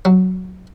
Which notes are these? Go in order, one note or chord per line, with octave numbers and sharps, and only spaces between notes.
F#3